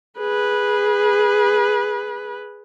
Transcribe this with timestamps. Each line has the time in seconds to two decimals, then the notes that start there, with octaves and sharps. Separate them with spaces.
0.19 G#4 B4